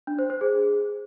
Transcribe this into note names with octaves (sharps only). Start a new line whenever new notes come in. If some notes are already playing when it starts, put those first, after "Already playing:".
D4
C5
C5
G#4